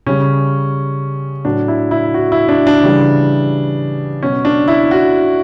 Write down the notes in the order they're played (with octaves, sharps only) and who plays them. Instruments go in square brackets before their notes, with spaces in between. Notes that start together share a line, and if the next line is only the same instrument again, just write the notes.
[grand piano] C#3 G3 C#4
A2 F#3 D4
E4
E4
F#4
E4
D4
D4
C#3 E3 G3
B2 F#3 C#4
D4
E4
F#4